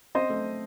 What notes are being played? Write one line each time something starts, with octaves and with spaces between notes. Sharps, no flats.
C4 C5 D#5
A3